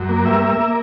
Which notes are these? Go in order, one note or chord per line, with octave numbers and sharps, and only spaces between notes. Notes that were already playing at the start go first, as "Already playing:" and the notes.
Already playing: F#2
A#3
G2 E5
A#3
A#3